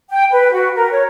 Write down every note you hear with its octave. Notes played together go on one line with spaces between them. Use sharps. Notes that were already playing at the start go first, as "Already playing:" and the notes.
G5
B4
F#4
A#4
C#5